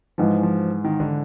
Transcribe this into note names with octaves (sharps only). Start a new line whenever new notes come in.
G#2 E3 F3 G#3
F3
D#3
D3